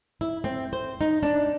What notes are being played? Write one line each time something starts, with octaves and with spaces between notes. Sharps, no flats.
E4
C4
C5
D#4
D4